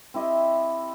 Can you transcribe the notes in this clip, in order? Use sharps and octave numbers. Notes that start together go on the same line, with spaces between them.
C4 E4 G4 D#5